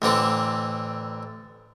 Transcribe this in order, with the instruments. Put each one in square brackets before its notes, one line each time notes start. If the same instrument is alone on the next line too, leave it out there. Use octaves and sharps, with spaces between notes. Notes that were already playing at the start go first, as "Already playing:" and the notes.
[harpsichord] A1 D3 C4 D4